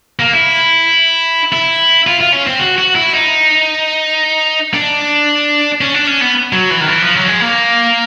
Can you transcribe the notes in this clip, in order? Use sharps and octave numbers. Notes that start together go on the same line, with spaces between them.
A#3
E4
E4
F4
F4
C#4
C4
F#4
F#4
E4
D#4
D4
C#4
D4
C#4
B3
F#3
E3
D#3
E3
F3
F#3
G#3
A#3